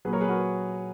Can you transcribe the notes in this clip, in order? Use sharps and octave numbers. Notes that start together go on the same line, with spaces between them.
A#2 F#3 G#4 B4
A#4 C#5
G#4 B4
F#4 A#4